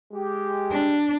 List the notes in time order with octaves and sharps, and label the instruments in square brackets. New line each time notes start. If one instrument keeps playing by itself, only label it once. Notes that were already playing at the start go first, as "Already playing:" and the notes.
[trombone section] G#3 G4
[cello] D4